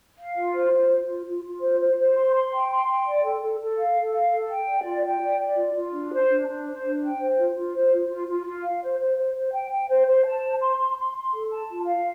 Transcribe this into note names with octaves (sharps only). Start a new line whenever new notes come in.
F5
F4
C5
F4
F4
F4
F4
F4
C5
C5
C5
C6
C6
G5
C6
G5
D5
A4
A4
A4
F5
A4
F5
A4
G5
D5
F4
G5
D5
D5
F4
F4
D4
C5
D4
D4
C5
D4
G5
C5
F4
F4
C5
F4
F4
F4
F4
F5
C5
C5
C5
C5
G5
G5
C5
C5
A5
C5
C6
C6
C6
C6
A4
A5
F4
F5